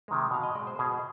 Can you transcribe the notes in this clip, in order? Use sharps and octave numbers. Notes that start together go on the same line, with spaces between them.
C3 D#3 G#3
B2 F5
D#5
G#3 D5
C5
B2 G#4